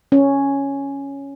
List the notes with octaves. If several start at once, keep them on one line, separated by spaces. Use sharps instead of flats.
C#4